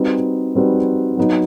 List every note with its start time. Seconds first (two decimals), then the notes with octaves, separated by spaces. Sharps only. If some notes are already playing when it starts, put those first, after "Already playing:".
Already playing: G3 C4 D#4 F#4 B4
0.55 G3 C4 D#4 F#4 B4
1.17 F#3 B3 D#4 F#4